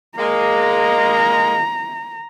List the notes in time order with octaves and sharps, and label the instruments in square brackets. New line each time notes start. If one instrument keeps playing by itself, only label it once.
[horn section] G#3 A#3 [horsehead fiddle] A#5